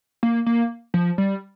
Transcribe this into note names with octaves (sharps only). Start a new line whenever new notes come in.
A#3
A#3
F3
G3